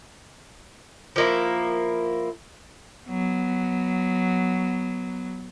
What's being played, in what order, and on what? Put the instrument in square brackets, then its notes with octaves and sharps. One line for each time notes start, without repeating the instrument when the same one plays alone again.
[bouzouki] F3 A#3 E4
[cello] F#3 B3